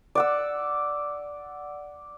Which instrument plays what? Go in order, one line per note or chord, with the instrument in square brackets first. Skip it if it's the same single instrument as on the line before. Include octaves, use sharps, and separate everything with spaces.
[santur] D5 F#5 E6